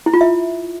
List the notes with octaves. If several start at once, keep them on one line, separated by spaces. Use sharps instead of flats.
E4
F4
E5